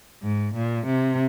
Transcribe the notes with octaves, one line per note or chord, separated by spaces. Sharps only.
G#2
A#2
C3